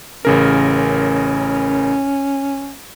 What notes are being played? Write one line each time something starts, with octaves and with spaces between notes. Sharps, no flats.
A1 C#3 C#4 A#4